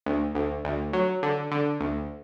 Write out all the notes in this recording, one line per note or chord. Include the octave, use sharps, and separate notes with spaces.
D2
D2
D2
F#3
D3
D3
D2